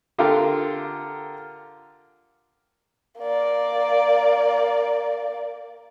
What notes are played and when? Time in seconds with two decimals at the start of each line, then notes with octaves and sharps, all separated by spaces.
0.19 D3 F4 G4 A#4
3.20 A#3 D5